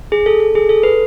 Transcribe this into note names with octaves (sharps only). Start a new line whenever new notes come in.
G#4
A4
A4
G#4
A4
B4